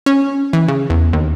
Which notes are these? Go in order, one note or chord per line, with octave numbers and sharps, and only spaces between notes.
C#4
E3
C#3
E2
D#2